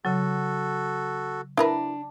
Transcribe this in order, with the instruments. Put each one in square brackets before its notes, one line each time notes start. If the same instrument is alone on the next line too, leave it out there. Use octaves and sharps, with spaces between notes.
[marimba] C#3 F#3 [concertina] F#4 A4
[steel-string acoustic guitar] D4 [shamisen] E4 A#4 B4